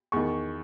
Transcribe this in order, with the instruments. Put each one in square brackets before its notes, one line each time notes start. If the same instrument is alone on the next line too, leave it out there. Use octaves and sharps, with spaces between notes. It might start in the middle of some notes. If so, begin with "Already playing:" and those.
[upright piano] E2 D#3 C#6